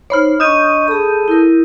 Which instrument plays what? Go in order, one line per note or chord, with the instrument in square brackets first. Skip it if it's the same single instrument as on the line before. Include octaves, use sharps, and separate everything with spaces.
[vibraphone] D#4 C5 [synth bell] C#5 B5 F6
[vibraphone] D4 C#6 [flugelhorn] D#5 [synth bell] D#6 G6 D#7
[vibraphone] G#4 B5 [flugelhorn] A4
[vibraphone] E4 A#4